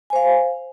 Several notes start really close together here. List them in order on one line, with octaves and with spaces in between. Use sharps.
G#5 C5 F5